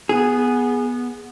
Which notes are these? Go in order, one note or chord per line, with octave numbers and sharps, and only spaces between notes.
B3 G#4